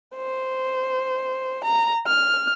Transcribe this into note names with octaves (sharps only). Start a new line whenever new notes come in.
C5
A#5
F6